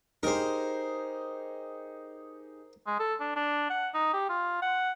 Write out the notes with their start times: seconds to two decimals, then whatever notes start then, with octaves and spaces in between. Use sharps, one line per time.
0.23 D#4 G4 G#4 A#4 C5
2.87 G#3
3.00 A4
3.20 D4
3.36 D4
3.70 F#5
3.94 D#4
4.13 G4
4.29 F4
4.62 F#5